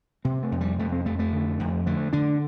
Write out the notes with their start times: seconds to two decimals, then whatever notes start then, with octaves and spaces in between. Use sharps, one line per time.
0.25 C3 C4
0.43 A3
0.52 F2
0.61 G3
0.79 F2 A3
0.92 C4
1.06 F2 A3
1.19 A3
1.33 D3
1.59 F2
1.86 D3 A3
2.13 D3 D4